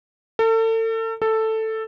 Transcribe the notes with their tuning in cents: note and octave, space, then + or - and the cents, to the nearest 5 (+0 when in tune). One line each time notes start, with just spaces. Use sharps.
A4 +35
A4 +5